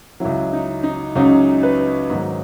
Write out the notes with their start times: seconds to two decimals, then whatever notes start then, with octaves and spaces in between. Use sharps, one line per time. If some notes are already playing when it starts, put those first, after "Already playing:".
0.20 C#2 C#3 F#3 E4
0.53 D#4
0.83 D#4
1.16 C#2 C#3 F#3 D#4
1.63 B4
2.10 G#2 D#3 F#3